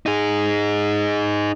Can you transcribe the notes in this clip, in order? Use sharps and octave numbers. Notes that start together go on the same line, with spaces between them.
D#4 G#4